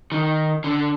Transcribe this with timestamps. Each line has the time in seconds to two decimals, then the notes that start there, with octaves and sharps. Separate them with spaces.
0.12 D#3
0.64 D3